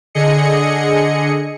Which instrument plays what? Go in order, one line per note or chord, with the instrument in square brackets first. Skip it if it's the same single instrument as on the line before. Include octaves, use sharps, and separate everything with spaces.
[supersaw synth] D3 G#4 D#5 C#7